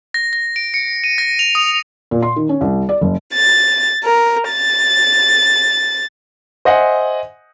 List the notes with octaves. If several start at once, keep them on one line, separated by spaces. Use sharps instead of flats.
A#6
A#6
D7
C#7
D#7
A#6
F7
D#6
A#2
C6
D#3
C#4
C2
D5
F#1
A6
A#4
A6
C5 D#5 E5 F#5 G#5